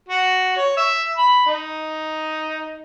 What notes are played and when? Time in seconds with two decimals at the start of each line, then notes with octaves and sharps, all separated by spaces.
0.09 F#4
0.57 C#5
0.77 E5
1.17 B5
1.46 D#4